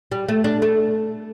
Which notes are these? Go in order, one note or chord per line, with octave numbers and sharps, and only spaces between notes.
G3
A3
D4
A3